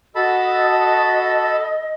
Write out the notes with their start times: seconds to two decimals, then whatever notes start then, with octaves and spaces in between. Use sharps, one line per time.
0.15 F#4 A4 D#5 A5 B5